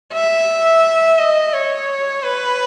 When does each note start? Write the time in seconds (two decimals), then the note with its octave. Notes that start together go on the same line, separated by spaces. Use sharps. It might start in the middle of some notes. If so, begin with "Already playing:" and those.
0.13 E5
1.18 D#5
1.53 C#5
2.24 B4